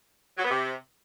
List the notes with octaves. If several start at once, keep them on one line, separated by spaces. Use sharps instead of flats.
F#3
B3
C3